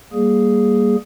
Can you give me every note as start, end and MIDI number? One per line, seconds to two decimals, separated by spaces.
0.13 0.96 55
0.13 0.96 58
0.13 0.96 68